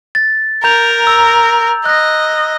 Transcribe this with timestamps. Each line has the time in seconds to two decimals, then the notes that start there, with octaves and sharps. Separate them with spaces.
0.15 A6
0.64 A#4 A#5 G6 F7
1.07 E6
1.86 D#5 F#6 A#6